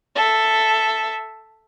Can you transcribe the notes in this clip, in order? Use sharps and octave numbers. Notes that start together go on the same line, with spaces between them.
A4 E5